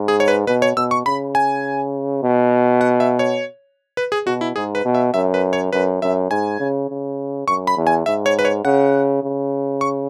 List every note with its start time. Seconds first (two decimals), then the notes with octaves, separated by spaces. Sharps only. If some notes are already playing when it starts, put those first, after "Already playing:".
Already playing: G#2
0.08 G#4
0.20 C#5
0.28 B4
0.47 B2 B4
0.62 C#5
0.77 B2 E6
0.91 C#6
1.06 C#3 B5
1.35 G#5
2.23 B2
2.81 F#5
3.00 E5
3.19 C#5
3.97 B4
4.12 G#4
4.26 B2 F#4
4.41 E4
4.56 G#2 G#4
4.75 B4
4.85 B2
4.95 E5
5.14 F#2 E5
5.34 B4
5.53 C#5
5.73 F#2 B4
6.02 F#2 E5
6.31 G#2 G#5
6.60 C#3
6.89 C#3
7.48 F#2 C#6
7.67 B5
7.77 E2
7.87 G#5
8.06 G#2 E5
8.26 C#5
8.39 B4
8.45 C#5
8.65 C#3 F#5
9.23 C#3
9.81 C#6